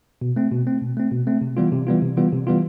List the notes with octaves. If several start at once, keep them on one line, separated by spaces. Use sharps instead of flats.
B2
A3 C4
B2
A3 C4
B2
A3 C4
B2
A3 C4
C3
E3 G3 B3 F4
C3
E3 G3 B3 F4
C3
E3 G3 B3 F4
C3
E3 G3 B3 F4